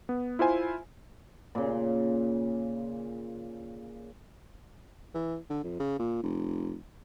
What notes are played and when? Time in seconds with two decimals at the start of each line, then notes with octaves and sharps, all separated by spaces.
0.09 B3
0.39 E4 F4 C5 G#5
1.55 A#2 C#3
5.14 E3
5.50 D3
5.64 F2
5.80 C#3
5.99 A#2
6.23 F1